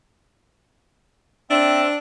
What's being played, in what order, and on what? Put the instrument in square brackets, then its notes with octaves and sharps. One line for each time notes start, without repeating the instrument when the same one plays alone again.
[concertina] C4 E5 [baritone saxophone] D4